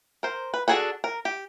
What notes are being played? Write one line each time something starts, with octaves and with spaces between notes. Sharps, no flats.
A#4 C5
B4
D4 F#4 G#4 A4 B4
A#4
G4